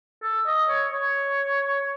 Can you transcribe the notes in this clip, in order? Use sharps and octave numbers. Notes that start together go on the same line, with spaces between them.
A4
D#5
C#5
C#5